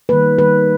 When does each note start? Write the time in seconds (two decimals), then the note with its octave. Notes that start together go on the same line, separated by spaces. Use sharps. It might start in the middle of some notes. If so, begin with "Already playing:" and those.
0.09 D#3 G3 A#3 B4
0.38 D#3 G3 A#3 B4